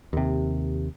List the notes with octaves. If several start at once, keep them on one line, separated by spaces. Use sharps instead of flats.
D#2 C3